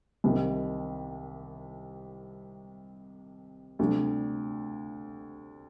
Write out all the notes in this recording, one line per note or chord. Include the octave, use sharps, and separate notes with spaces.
C2 C3 D#3
D2 C3 G3